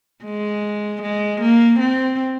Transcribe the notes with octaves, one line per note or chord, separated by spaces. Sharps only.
G#3
G#3
A#3
C4